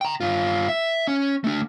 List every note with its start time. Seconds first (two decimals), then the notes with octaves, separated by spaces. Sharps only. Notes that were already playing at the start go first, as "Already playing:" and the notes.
0.01 G5 A#5
0.21 G2 F4
0.68 E5
1.08 C#4
1.44 A3 D4